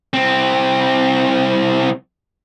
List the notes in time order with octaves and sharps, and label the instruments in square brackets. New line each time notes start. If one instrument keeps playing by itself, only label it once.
[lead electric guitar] C2 C4